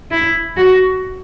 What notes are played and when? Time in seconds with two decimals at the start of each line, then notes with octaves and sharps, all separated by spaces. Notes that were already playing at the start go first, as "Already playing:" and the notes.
0.11 E4
0.57 F#4